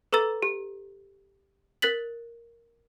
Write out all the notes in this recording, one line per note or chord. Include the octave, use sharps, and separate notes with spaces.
A4 B4 A#5 E6 A6
G4
A#4 F#6 A6 B6 F#7